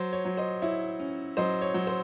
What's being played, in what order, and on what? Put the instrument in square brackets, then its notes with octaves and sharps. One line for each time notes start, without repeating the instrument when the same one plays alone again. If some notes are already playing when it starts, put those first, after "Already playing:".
Already playing: [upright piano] F#3 C5
C#5
F#3
C5 D#5
E4 C#5 E5
C#4
F#3 C5 D#5
C#5
F#3
C5